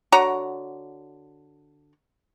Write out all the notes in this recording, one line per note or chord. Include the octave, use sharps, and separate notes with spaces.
D3 F#4 C#5 A#5